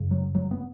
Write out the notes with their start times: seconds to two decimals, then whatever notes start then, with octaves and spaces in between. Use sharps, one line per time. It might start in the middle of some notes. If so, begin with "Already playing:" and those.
Already playing: F#2 C#3
0.11 F#3
0.35 F#3
0.51 B3